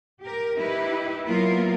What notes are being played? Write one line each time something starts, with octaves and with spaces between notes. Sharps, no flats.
G4 A#4
D#4 E4 G4 B4
F#3 A#3 B3 E4 F4 A#4